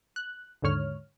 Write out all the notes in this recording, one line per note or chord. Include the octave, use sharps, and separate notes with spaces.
F#6
D#2 G#2 D3 C#5 F6